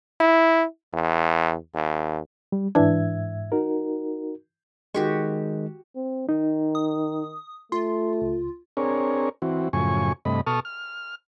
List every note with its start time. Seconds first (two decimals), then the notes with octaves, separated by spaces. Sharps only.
0.20 E4
0.93 E2
1.74 D#2
2.52 G3
2.75 G#2 E3 D4 E5 G#6
3.52 D#4 F#4 A#4
4.94 D#3 G#3 F#4 G4 C#6
5.96 C4
6.29 D#3 D#4
6.75 D#6
7.72 A3 F4 C6
8.22 C#2
8.77 C4 D4 G#4 A#4 C#5
9.42 E3 C4 F#4
9.73 F#2 A2 C#3 F3 G#5 C#6
10.25 G2 C3 A3 D#5 B5
10.47 B2 A4 A5 C#6 D#6 F6
10.65 F6